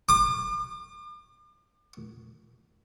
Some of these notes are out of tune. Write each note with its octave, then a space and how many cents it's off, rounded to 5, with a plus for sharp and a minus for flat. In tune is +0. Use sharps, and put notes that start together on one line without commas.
D6 +40